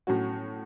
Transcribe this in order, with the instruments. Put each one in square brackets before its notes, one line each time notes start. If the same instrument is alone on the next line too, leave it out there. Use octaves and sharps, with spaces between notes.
[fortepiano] A2 F#3 C#4 F#4